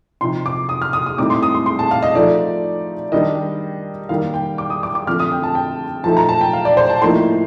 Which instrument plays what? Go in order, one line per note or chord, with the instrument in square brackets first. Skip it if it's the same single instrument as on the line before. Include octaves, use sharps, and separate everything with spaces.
[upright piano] C3 F3 C4 D#4 C6
D6
D#6
F6
D#6
D#6
A2 G3 C4 D#4 D6
C6
D#6
C6
C6
A5
F5
D#5
F3 A3 D#4 D5
D#3 G3 D4 D#5
D#3 G3 A#3 F5
G5
D6
D#6
D6
D6
D3 F3 A3 C4 F6
D#6
G5
A5
G5
F3 A3 D#4 A5
A#5
A5
G5
F5
D5
C5
A5
A2 F3 A#3 D#4 C6